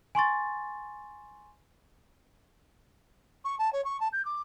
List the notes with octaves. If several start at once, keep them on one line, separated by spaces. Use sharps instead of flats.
G#5 C6 C#6 A6
C#6
A5
C#5
C#6
A5
G6
D6